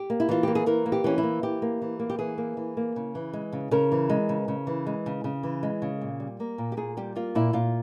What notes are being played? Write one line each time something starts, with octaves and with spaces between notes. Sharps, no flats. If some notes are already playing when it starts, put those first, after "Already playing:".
Already playing: G4
A#3
E4
E3 F4
A#3 G4
G#4
E3 A#4
A#3
G4
E3 C#4
E4
A#3
E3 G4
A#3
E3
A#3
G4
E3 G#4
A#3
E3
A#3
C#3
E3
G#3
C#3
C#3 A#4
E3
G#3
C#3
C#3
E3
G#3
C#3
C#3
E3
G#3
C#3
A#2
G3
A#3
A#2
G4
A#2 G#4
G3 G4
A#3 F4
A#2 E4
A#2 F4